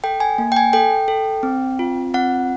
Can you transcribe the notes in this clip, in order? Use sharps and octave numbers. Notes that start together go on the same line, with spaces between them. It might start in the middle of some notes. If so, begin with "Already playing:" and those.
A4 G5
G#5
A#3
G5
G#5
A4 G5
A4
C4
F4
C4 F#5